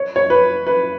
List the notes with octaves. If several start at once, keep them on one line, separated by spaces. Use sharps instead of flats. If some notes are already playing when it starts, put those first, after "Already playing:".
Already playing: C#5
C#5
B4
B4